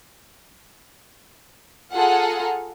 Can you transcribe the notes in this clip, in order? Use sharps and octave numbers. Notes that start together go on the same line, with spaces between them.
F4 G#4 A4 F#5 A#5